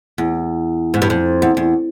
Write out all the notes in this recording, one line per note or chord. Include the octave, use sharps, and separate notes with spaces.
E2
G#2
G2
F2
E2
E2